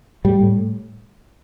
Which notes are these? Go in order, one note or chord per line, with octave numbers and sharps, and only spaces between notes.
A2 G3
A2